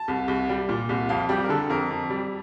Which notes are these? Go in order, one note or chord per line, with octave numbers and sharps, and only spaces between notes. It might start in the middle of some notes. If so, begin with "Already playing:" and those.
Already playing: A5
C2
C2
G3
A#2
C2
F2 F5
G3 G4
A#4
D3 A4
F2 A#4
F2
G3